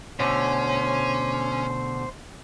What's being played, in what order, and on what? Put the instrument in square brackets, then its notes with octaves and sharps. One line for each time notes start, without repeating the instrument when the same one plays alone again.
[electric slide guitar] B2 D3 A3 [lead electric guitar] C#4 [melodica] C5